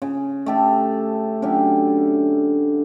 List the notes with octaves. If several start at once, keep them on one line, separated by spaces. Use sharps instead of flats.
C#3
A3 G4 A4
D3 F#3 C#4 G4